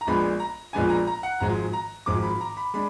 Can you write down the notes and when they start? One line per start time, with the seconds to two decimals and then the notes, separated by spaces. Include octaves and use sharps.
0.01 A#5
0.07 A#1 A#2 G#3 B3 D4 B5
0.40 A#5
0.73 A#1 A#2 G#3 B3 D4 G#5
0.90 A#5
1.07 A#5
1.23 F#5
1.40 G#1 G#2 F3 G#3 A#5
1.73 A#5
2.06 G#1 G#2 F3 G#3 D6
2.23 B5
2.41 A#5
2.57 B5
2.74 G#3 D4 B5